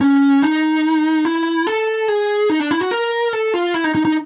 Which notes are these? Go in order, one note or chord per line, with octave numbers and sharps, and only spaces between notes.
C#4
D#4
E4
A4
G#4
D#4
D4
E4
F#4
A#4
A4
F4
E4
D#4
D#4
D#4